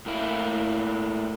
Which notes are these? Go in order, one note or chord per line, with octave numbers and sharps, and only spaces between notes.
A2 A#3 E4